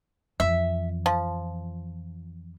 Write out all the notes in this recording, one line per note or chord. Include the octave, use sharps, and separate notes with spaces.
F2 E3 E5
F3